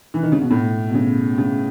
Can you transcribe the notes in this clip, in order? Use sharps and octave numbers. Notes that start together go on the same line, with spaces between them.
E3
D#3
C#3
B2
A2
B2
C#3
C#3